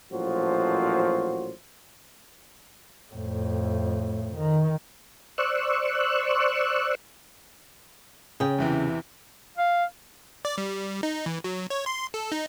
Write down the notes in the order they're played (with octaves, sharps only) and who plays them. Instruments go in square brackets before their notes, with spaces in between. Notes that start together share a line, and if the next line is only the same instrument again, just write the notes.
[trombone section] A1 A#2 F3 F#3 F#4 C5
[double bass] F2 A2
D#3
[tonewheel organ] C5 D5 C#6 E6 F#6
[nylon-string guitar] C#3 G5 [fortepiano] G#4
[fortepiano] E2 C3 E3
[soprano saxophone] F5
[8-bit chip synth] D5
G3
D#4
E3
F#3
C#5
C6
A4
D#4